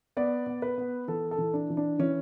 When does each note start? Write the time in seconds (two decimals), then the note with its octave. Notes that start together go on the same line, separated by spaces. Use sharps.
0.17 B3 D5
0.47 B3
0.62 B4
0.78 B3
1.08 E3 A4
1.31 A4
1.38 E3
1.54 D4
1.70 E3
1.77 D4
1.99 E3 C#4